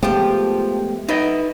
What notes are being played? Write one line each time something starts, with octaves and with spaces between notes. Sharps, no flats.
F3 G#3 A3 B3 G4 G5
D#4 E4 B4 D#5